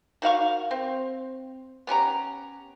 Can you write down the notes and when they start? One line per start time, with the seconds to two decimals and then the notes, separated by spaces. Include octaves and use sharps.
0.22 D#3 F#4 F5 C#6
0.71 C4
1.87 B3 C#4 G4 A#5